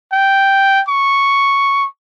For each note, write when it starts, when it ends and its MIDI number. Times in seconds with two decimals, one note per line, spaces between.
0.13 0.81 79
0.89 1.86 85